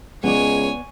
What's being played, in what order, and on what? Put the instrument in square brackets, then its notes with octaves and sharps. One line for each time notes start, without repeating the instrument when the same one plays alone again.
[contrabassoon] C#2 [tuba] G#3 [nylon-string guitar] B3 D5 [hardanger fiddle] C#5 G#5